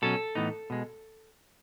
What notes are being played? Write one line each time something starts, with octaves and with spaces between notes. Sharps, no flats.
B2 F#3 C#4 A4
A2 E3 B3 D#4
B2 G#3